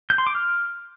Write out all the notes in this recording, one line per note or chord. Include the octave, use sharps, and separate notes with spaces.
G6
C6
D6
F6